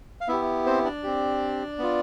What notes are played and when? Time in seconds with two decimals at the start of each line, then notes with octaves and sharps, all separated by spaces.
0.21 F5
0.28 B3 E4 G4 E5
0.66 C4 C5
0.84 D4 D5
1.03 C4 G4
1.79 B3 F4